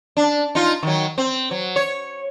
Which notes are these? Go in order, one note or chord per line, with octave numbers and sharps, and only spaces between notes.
D4
D#4 F4
D#3 F#3
C4
F#3
C#5